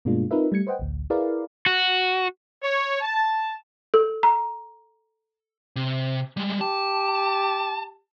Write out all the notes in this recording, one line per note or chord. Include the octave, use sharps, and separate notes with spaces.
G2 B2 G#3 A#3 D4 F4
C4 D#4 F4 A#4 B4 E5
G3 A3 G#6 C#7
B4 C5 D#5 F#5 G5
A1 D2
E4 G#4 A#4 B4 D5 F5
F#4
C#5
A5
A4
A#5
C3
G3 G#3
G4 A5